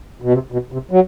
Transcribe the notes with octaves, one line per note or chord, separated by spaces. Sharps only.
B2
C3
B2
C3
F#3